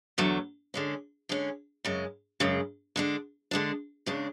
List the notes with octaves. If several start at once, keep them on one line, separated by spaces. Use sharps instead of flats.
E2 D3 F#3 A3
D3 G#3 C#4
D3 G#3 C#4
F#2 C#3 G#3
F#2 C#3 G#3
D3 G#3 D4
D3 G#3 D4
E2 C#3 G#3 D4